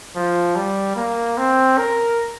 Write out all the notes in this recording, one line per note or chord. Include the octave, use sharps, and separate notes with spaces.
F3
G3
A#3
C4
A#4